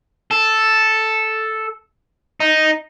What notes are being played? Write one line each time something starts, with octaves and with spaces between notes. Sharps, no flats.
A4
D#4